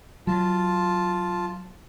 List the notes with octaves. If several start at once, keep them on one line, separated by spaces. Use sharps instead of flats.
F#3 F4 A5